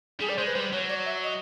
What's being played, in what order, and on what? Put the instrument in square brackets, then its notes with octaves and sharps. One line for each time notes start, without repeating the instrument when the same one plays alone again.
[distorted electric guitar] G3 [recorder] G#4
[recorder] D5
[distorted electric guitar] G#3 [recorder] C5
[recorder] B4
[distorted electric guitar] G3 [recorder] C5
[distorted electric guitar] F#3 [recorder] C#5
[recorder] D5
E5
D#5